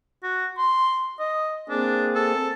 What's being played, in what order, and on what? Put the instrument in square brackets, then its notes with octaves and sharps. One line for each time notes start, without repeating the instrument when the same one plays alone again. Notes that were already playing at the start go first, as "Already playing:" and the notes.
[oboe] F#4
C6
D#5
[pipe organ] A#3 C4 G#4 [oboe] D4
[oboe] A4